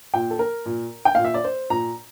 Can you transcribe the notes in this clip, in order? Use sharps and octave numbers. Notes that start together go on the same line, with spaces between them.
A#2 G5
A4
A#4
A#2
G5
A#2 F5
E5
D5
C5
A#2 A#5